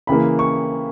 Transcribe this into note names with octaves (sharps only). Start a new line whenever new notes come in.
C#3 E3 A#3 B5
C#6